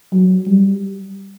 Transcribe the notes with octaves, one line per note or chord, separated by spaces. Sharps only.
F#3
G3